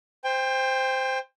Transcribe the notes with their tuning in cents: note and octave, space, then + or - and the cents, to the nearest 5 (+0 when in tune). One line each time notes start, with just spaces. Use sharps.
C5 -5 G5 +25